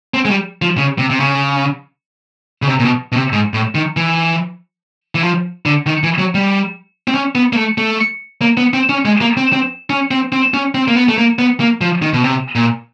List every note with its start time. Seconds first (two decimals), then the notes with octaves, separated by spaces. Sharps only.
0.14 C4
0.25 G#3
0.30 G3
0.62 F3
0.78 C#3
0.99 C3
1.10 C3
1.20 C#3
2.62 C#3
2.68 C3
2.79 A#2
2.85 B2
3.12 B2
3.16 C3
3.32 G#2
3.54 A2
3.75 D#3
3.97 E3
5.15 E3
5.23 F3
5.66 D3
5.87 D#3
6.03 E3
6.19 F#3
6.35 G3
7.08 C4
7.14 C#4
7.35 B3
7.53 A#3
7.57 A3
7.78 A3
8.41 A#3
8.57 B3
8.74 C4
8.89 C#4
9.05 G#3
9.21 A#3
9.37 C4
9.53 C4
9.90 C#4
10.11 C4
10.32 C4
10.54 C#4
10.75 C4
10.88 A#3
10.96 B3
11.08 A3
11.18 A#3
11.39 B3
11.60 A#3
11.81 F3
12.02 D#3
12.14 B2
12.24 C3
12.55 A#2